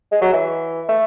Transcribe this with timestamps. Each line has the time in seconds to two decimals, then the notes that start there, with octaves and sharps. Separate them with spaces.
0.12 G#3
0.22 F#3
0.33 E3
0.89 A3